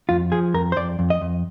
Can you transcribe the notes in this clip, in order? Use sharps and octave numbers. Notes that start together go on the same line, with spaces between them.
F2 F4
F3 G#4
F2 A#4
C5
F2 D5
F2
D#5
F2